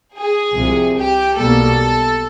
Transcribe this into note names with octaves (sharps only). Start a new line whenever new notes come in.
G#4
C2 C3 F3
G4
B1 B2 G3 A#3 A4